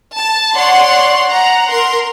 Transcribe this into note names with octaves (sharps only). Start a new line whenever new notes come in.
A5
C#5 D5 F#5 C6
F#5 A#5
A#4 C6